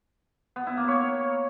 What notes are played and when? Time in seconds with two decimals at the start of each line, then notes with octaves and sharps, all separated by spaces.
0.56 B3
0.67 E4
0.77 A#3
0.88 C#5